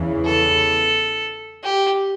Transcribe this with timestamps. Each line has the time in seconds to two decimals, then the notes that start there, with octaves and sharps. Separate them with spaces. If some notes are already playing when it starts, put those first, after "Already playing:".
Already playing: E2 C#3 E3
0.25 A4
1.64 G4